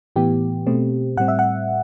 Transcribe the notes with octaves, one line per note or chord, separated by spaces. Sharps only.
A2 E3 B3 G4
B2 A3 C4
A2 G3 C4 F#5
E5
F#5